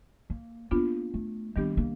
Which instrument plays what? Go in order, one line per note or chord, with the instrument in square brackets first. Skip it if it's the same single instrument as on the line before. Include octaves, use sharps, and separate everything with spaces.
[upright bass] A#3
[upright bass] A#3 [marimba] B3 D4 F4
[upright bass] A3
[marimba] D#3 G3 B3 D4 G4 [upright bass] A#3
[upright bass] A#3